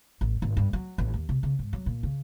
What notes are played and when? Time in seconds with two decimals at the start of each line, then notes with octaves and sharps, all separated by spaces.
0.21 A1
0.42 G#1
0.57 G2
0.73 F#3
0.98 A1
1.14 D#2
1.29 C3
1.43 C#3
1.59 G#2
1.73 F#3
1.86 A#2
2.03 C#3